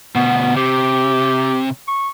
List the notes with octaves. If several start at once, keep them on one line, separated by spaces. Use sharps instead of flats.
D2 B2 B3
C3 G4
C#6